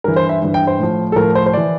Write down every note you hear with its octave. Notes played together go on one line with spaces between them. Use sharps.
G2 E3 A#4
C5
E5
G2 E3
G5
C5
A2 F3
A4
A2 F3 A#4
C5
C5
E3 D5